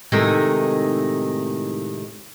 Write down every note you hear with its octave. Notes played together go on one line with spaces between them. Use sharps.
A2 C3 D#3 G#3 A3 D#4